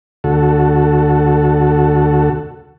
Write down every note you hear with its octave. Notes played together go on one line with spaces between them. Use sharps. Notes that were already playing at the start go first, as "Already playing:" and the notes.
D2 F#4 A4